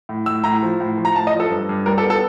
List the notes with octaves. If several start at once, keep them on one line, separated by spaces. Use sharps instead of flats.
A2
A2 E6
A2 A#5
F3
A2
F3
A#5
A2 A5
D#5
F3
A4
G2
G2
G3 A#4
A4
B3
A4